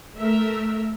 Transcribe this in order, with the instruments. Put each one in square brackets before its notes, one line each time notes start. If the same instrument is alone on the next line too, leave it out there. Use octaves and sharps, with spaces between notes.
[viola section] A3 A#4 E5